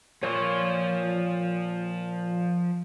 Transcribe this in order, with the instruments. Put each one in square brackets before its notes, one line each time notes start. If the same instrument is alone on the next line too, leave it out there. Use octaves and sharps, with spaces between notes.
[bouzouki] A#2 C#5 [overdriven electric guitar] F3 C6